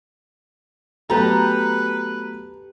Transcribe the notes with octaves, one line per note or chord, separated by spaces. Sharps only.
F#3 A3 B3 G4 A4 B4 A#5